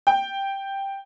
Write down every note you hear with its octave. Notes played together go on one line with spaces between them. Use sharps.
G5